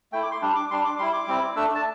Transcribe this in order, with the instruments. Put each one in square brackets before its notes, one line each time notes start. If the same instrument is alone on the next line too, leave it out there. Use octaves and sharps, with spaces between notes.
[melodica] A3 E4 G5
D6
C6
G3 D4
D6
G3 D4 C6
D6
G3 E4 C6
D6
G3 C4 E4
A3 D4 E6
A5